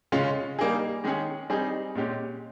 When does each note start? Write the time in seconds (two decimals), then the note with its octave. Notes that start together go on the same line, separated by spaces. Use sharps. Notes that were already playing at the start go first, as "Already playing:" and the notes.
0.12 C#3 G#3 C#4 F4
0.59 G3 A#3 D#4 G#4
1.04 D#3 G#3 C#4 G#4
1.50 G3 C4 D#4 G#4
1.95 A#2 G#3 C#4 G4